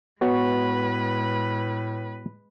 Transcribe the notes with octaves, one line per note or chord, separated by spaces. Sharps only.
A2 G#3 B3 F#4 B4 C#5